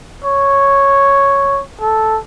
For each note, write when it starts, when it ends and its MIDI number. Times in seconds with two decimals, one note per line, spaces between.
0.24 1.61 73
1.81 2.19 69